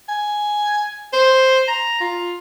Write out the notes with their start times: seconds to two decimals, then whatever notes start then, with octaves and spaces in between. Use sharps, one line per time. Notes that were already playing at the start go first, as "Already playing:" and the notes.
0.09 G#5
1.13 C5
1.68 A#5
2.01 F4